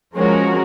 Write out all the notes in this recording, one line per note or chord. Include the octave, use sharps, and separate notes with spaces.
F3 G#3 C#4 F#4 A#4